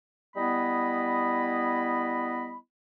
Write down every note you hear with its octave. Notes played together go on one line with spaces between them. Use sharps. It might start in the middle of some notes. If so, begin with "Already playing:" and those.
G3 B3 E4 D#5 B5